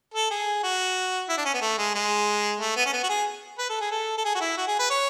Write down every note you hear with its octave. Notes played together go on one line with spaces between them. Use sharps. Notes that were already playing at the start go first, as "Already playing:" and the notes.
A4
G#4
F#4
E4
D4
C#4
B3
A3
G#3
G#3
A3
B3
C#4
B3
F#4
G#4
B4
A4
G#4
A4
A4
G#4
F#4
E4
F#4
G#4
B4
C#5